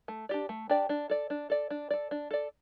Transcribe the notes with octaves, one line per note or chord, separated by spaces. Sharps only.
A3
D4 G4 D5
A3
D4 G4 D5
D4
A4 D5
D4
A4 D5
D4
A4 D5
D4
A4 D5